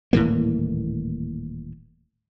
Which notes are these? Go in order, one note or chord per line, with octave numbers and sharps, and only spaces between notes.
D#1 A2 E3 A#3